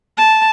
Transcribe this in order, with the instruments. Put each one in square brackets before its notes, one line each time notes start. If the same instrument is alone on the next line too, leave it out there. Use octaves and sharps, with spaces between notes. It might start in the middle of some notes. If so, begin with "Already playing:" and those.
[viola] A5